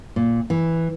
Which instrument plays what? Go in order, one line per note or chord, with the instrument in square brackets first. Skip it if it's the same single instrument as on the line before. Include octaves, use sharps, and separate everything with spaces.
[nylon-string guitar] A#2
E3